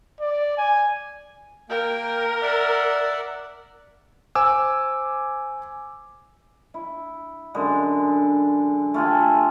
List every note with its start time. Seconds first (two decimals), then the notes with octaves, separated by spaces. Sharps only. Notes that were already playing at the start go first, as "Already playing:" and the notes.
0.20 D5
0.58 G#5
1.69 A#3 A#4 G5
2.42 D5 E5 F#5
4.35 C5 G#5 D6 E6
6.74 E4
7.54 F#2 D3 G#3
8.94 A3 F4 G4 G#5